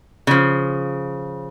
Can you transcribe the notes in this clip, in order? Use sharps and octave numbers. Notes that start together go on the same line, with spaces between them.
C#3 F3